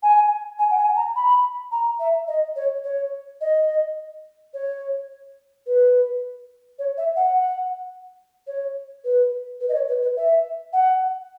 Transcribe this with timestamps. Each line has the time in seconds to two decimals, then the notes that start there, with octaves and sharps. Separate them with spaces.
0.03 G#5
0.59 G#5
0.71 F#5
0.78 G#5
0.96 A#5
1.16 B5
1.72 A#5
2.00 E5
2.28 D#5
2.56 C#5
2.84 C#5
3.41 D#5
4.54 C#5
5.66 B4
6.79 C#5
6.97 E5
7.16 F#5
8.47 C#5
9.04 B4
9.60 B4
9.69 D#5
9.74 C#5
9.88 B4
10.02 B4
10.17 E5
10.73 F#5